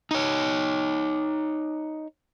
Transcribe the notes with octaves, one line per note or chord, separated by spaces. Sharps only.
D#4 C#5